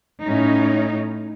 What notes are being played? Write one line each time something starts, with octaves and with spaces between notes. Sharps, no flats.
A2 C#4 D#4